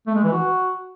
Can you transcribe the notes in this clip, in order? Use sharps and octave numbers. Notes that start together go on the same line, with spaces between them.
A3
G#3
E3
F#4